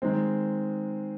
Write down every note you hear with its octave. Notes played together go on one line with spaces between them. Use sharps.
D#3 G#3 C4